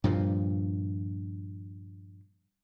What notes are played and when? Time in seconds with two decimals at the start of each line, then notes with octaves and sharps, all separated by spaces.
0.04 G2 A#2 F3